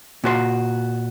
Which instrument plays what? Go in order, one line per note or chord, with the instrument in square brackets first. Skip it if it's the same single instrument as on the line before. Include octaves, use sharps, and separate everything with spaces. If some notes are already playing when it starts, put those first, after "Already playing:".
[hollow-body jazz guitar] A#2 F#4 C5 C6